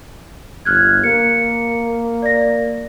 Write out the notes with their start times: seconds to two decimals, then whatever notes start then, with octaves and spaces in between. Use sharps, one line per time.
0.65 G1 F6 F#6 G#6
1.04 A#3 C#7
2.22 D5 A#6